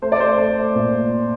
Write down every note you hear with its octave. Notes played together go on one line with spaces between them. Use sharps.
A3 C5
D5
C5
A3
A#2